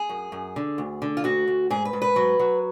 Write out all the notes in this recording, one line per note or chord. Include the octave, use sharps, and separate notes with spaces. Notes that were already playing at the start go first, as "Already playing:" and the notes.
Already playing: G#4
F#2
F#2
D3
D2
D3
F4
D2 F#4
D2
G#2 G#4
B4
G#2
B4
F#3
F#3